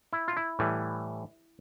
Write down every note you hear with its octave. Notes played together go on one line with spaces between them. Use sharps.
E4
F4
E4
A2 E3 G3